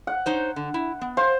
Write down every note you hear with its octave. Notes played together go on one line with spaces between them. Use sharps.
F#5
D#4 C5 C#5
D3
E4
B3
C5 F5